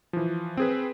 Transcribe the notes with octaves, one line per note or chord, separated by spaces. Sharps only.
E3 F3
C4 G#4 B4